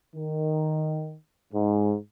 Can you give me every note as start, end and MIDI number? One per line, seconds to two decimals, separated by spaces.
0.15 1.15 51
1.53 1.96 44